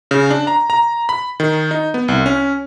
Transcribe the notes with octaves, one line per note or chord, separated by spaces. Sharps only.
C#3
D4
A#5
A#5
B5
D#3
D#4
B3
C2
C#4